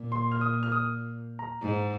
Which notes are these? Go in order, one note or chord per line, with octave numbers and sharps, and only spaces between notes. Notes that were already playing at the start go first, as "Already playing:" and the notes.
Already playing: A#2
C6
F6
D#6
F6
D#6
A#5
G#2